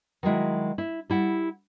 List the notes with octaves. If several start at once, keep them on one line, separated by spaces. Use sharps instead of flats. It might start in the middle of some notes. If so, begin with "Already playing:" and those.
D#3 F#3 G#3 E4
E4
G3 E4 F#5